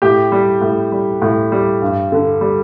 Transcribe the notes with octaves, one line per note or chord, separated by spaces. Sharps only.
A2 G4
G3
A2
G3
A2
G3
G2
D3
G3